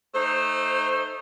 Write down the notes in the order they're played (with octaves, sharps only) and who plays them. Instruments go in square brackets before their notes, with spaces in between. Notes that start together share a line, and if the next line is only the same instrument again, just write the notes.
[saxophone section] A3 D#4 C5